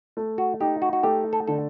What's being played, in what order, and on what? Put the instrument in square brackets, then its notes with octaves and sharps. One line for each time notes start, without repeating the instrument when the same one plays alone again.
[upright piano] A3
[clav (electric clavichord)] F#4
[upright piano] D#4 [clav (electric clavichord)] G4
[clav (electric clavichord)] F#4
F#4
[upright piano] A3 [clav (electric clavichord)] G4
[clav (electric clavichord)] A4
[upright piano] D3 [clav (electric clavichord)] A4